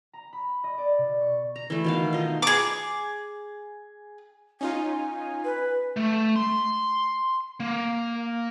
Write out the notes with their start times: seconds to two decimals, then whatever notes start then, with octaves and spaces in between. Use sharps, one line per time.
0.13 A#5
0.33 B5
0.64 D#5
0.78 D5
0.98 B2
1.20 C#6
1.56 A#5
1.70 E3 A3
1.84 B2 D#3 F5
2.13 D#4 F4
2.42 G#4 D6
4.61 C#4 D#4 F4 G#5
5.45 B4
5.97 A3
6.36 C6
7.60 A#3